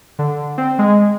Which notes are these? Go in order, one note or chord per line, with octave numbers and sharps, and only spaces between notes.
D3
C4
G#3